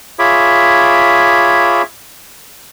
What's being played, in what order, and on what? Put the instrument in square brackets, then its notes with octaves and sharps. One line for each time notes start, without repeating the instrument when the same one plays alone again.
[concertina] F4 G#4 C#5 E5 B5 D6